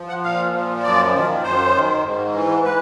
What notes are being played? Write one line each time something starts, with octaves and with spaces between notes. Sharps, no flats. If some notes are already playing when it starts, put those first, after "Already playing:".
Already playing: F3
F#5
A#2 F5
F3
F#2 D5
D#3
F#2 C5
D#3
G#2
E3
B4